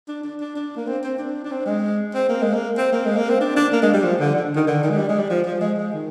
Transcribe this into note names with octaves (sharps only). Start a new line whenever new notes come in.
D4
D4
D4
D4
A#3
C4
C4
D4
D4
C4
G#3
C4
A#3
G#3
A#3
C4
A#3
G#3
A#3
C4
D4
D4
A#3
G#3
G3
F3
D3
D3
D#3
D3
D#3
G#3
G3
G#3
G3
F3
F3
G#3
G#3
D#3